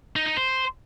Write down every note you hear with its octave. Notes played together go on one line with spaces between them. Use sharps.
D#4
D#4
C5